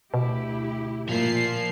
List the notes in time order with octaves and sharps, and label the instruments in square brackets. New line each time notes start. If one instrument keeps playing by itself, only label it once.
[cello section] D2 E4 G4 [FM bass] B2
[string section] A#2 C7 [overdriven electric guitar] F3 F4